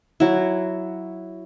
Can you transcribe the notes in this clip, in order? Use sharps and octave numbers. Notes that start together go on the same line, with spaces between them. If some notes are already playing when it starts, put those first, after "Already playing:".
F#3 E4